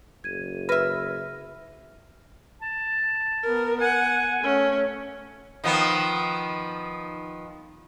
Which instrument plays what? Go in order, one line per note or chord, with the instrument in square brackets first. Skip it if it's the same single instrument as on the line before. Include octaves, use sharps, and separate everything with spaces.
[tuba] F#1 [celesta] G#6 D#7
[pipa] B4 E5 [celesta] F6 A#6
[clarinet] A5
[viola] B3 A#4
[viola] F#5 [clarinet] G#5
[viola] A3 C#4
[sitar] D#3 F3 B3